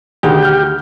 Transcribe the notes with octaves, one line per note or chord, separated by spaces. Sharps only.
D2 D#3 G4 G#4
F6 G6